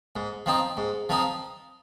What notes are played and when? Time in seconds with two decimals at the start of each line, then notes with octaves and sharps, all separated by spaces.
0.16 G#2
0.46 F3 C4 D#4
0.77 G#2
1.09 F3 C4 D#4